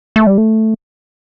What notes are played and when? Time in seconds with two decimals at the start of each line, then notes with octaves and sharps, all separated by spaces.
0.16 A3
0.27 G3
0.38 A3